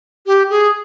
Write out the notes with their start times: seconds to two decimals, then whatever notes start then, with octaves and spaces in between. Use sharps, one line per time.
0.26 G4
0.50 G#4